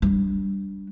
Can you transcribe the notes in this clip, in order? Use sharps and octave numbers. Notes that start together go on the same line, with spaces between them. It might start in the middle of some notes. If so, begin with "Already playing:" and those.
G3 D4